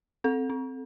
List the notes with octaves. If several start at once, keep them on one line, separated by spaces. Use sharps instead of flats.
C4 A4
C4